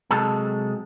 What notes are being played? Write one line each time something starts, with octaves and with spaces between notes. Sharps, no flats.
C3 F#3 G#3 A4